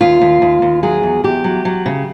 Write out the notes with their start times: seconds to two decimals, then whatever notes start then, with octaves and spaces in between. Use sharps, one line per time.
0.01 D#2 F4
0.21 D#2
0.42 D#2
0.62 D#2
0.83 F#3 G#4
1.03 E2
1.24 E2 G4
1.44 F#3
1.65 F#3
1.86 C#3